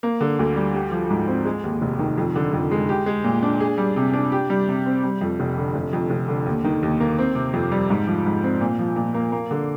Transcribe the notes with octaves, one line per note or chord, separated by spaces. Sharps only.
A#3
D3
D2
G3
G4
F3
G#2
C4
G#3
D#2
F1
D#3
F2
D3
F2
G#3
G4
G#3
A#2
D4
G#4
G3
C3
D4
G4
G3
C3
C4
G3
F2
F1
D3
F1
F2
F1
D3
D#2
D#3
D#2
A#3
C4
C3
F2
G3
G#2
F3
G#2
C4
A#2
F3
A#2
A#3
A#3
D3